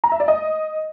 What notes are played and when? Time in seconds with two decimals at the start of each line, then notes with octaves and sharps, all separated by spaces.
0.04 A#5
0.12 E5
0.20 D5
0.28 D#5